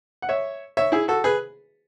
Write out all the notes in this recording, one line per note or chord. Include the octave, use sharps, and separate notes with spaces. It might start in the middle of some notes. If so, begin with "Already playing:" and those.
F#5
C#5 E5
C#5 E5
E4 G#4
F#4 A4
G#4 B4